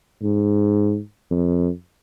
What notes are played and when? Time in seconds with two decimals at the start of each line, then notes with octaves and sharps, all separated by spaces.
0.22 G#2
1.31 F2